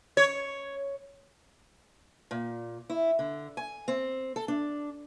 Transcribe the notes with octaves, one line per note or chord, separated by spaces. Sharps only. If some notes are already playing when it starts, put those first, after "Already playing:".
C#5
A#2
E4
D3
G#5
C4
A4
D4